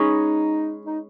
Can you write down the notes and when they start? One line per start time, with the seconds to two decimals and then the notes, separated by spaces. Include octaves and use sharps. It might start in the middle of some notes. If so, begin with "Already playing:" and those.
Already playing: G#3 C#4 D#4 G#4 B4
0.86 D#4